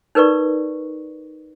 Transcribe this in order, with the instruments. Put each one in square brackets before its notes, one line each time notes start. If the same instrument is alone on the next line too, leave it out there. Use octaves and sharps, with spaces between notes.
[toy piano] D#4 A#4 B4 D5 C#6